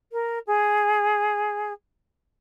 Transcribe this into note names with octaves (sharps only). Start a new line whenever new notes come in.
A#4
G#4